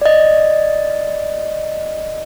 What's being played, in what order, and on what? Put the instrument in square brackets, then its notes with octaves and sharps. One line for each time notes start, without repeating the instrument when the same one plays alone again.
[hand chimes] D5 D#5